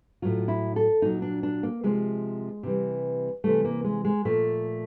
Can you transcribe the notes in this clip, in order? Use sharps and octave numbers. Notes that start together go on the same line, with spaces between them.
A2 F#3 F4
E4
A4
A#2 F#3 D#4
D4
D4
A#3
C3 F3 G#3
C3 E3 G3
C3 E3 G3 A3
A#3
G#3
G#3
A#2 F3 A3